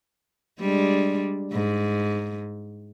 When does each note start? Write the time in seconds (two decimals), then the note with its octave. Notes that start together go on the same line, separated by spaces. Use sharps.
0.60 G3 G#3 D4
1.53 G#2